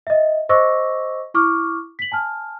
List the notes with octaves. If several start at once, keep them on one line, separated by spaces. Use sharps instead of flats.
D#5 E5
C5 D#5 C#6 D6 E6 A#6
E4 C#6 D6 F6
B6 F#7
G#5 A5 F6